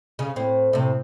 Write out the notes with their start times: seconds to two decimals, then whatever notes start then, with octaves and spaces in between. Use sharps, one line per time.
0.19 C#3
0.36 A2 C4
0.73 A2 C3